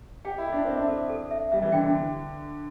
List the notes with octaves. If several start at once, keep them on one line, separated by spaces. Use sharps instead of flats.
G4 G5
E4
A4
D4
C4 E5
D4
A4
A4
E5
G3 E5
E3
D3 G5
D3